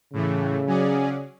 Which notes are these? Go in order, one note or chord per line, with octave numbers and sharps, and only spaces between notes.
A2 C#3 E3 A3
F#3 C#4 G#4 D5